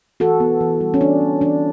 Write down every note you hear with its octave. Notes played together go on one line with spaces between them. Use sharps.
E3 F#4 A4
B3
E3
G3
C#4
E3 D4
B3
E3 D4